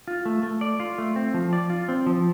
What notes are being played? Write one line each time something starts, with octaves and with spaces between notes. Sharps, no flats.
F4
A3
A3
D5
F4
A3
C4
F3
D5
F4
C4
F3